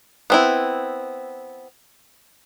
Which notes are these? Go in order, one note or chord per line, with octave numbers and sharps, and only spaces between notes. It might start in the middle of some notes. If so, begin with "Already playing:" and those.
B3 C4 E4